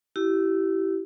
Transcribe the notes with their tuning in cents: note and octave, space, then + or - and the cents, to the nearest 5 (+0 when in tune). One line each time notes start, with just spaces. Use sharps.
E4 +0 G4 -30